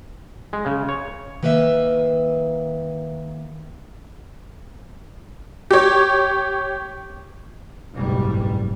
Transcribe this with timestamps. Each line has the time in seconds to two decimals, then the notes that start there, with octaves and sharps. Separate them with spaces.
0.53 G#3
0.66 C#3
0.89 C#5
1.43 D#3 A#3 B4 D#5 E5
5.71 G4 C#5
7.93 F#1 B1 G#2 G3